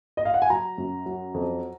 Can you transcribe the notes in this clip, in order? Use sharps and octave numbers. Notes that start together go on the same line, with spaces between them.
D#5
F5
F#5
G#5
F#3 A#5
F#2
F#3
F2